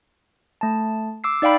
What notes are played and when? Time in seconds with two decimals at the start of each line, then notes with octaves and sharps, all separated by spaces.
0.61 A3 A5
1.24 D6 E6 C7
1.42 D#4 D5 F5 G5 B5